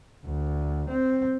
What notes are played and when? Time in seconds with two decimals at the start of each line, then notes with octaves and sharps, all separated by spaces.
0.25 D2
0.90 C4